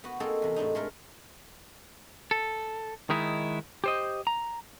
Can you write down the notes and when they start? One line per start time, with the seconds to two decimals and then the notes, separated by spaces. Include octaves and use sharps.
0.04 B3 F#4
0.20 A#3 C4 D#4 F#4 G#4 A4
0.42 E2 C3
0.56 A2 C3 D4 D#4
0.75 G#3 A3 A#4
2.31 A4
3.10 D#3 G#3 D#4 E4
3.84 G4 C5 D#5
4.27 A#5